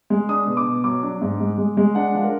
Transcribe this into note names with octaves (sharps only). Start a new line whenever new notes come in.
G#3
D4 D#6
B2
D6
B2
F#3 D6
D4
G#2
G#3
G#3
G#3
D4 F#5
F3
A#4